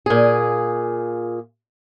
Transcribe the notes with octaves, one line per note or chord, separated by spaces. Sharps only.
A#2 G#4